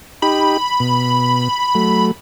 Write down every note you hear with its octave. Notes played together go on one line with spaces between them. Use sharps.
D#4 G4 B5
B2
F#3 A3